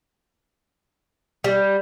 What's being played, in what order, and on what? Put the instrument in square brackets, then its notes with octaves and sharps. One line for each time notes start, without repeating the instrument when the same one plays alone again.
[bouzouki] G3